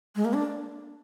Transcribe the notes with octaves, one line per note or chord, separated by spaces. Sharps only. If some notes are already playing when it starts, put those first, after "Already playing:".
G#3
A#3
D4